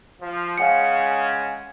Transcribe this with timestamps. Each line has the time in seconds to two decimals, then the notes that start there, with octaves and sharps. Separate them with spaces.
0.22 F3
0.58 C#3 G#3 C#4 F5 F#5 C#7